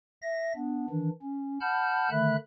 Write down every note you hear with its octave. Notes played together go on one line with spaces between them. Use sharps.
E5 A#6
B3 D4
D#3 E3 D4
C#4
F#5 A5 B5 F6 G6
D3 D#3 A3 E5 B5 F#6